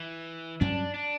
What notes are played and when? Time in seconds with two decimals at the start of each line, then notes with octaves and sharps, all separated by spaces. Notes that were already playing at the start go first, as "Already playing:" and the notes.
Already playing: E3
0.61 G2 F#3 C#4 D4
0.94 D4